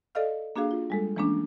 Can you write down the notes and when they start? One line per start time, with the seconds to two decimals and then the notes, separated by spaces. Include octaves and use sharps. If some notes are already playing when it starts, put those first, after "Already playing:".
0.15 A4 D5 D#5 F5 F6
0.56 A#3 D4 F#4 G#4 F5
0.71 F4
0.90 G3 G#3 A4
1.16 E3 F3 G#3 A#3 C#4 D4